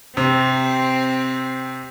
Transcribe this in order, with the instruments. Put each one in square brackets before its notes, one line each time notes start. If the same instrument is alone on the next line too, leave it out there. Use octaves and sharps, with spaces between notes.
[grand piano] C3 [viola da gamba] C4